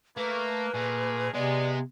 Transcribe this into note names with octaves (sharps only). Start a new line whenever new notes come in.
A3 A#3 B4
A#2 A3 G#4 A#4
C3 G#3 B3 D5